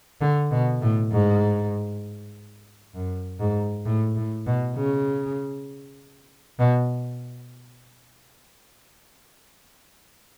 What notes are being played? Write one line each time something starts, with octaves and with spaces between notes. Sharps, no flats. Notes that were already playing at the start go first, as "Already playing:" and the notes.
D3
B2
A2
G#2
F#2
G#2
A2
A2
B2
C#3
B2